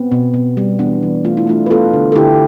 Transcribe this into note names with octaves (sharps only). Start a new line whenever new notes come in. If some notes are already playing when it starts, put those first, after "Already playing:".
Already playing: B3 C4
B2
B2
G3
E3 B3 D4
E3
A3 F4
E4
A3 D4 F4
B4
B3 F4 A4
D3
A4
D3 E4 G4